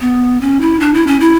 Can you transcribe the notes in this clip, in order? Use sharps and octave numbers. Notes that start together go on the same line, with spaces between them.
B3
C#4
E4
D4
E4
C#4
E4